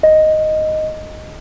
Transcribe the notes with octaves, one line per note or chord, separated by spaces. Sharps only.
D#5